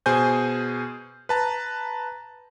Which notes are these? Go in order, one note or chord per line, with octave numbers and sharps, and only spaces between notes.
B2 G#4 C5 G#5 G6
B4 A5 A#5